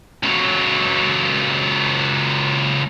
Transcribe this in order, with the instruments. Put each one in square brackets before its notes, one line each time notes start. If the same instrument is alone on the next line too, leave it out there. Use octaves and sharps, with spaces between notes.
[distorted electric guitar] C#2 F#3